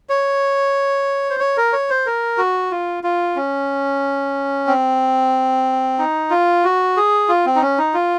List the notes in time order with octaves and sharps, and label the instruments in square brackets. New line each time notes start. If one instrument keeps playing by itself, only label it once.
[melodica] C#5
C5
C#5
A#4
C#5
C5
A#4
F#4
F4
F4
C#4
C4
D#4
F4
F#4
G#4
F4
C4
D#4
C#4
D#4
F4